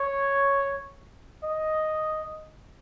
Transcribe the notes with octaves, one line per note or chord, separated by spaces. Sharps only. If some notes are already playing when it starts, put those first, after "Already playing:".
Already playing: C#5
D#5